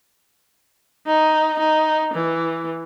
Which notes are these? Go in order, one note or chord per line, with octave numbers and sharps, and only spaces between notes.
D#4
D#4
E3